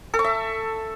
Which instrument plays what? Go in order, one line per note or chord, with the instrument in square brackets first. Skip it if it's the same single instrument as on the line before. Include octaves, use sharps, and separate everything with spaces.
[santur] A4
C#6
E5